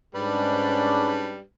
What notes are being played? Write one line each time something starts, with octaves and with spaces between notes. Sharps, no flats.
G#2 G3 C#4 D4 B4